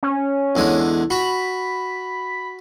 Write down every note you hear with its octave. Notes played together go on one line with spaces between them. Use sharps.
C#4
E2 D3 G#3
F#4 B5